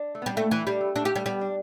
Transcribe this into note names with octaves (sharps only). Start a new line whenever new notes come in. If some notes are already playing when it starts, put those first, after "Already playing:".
Already playing: D4
A3
B3
G3 D4
A3 E4
E3 E4
G3 D4
A3
A3 D4
G4
G3 A3
G3 B3
D4